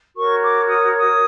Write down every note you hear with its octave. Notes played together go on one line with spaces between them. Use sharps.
F#4 A#4 C#5 C#6
D6
D#6
D#6